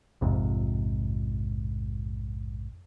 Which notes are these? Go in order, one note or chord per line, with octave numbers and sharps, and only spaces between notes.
A#1 F2 G#2 C3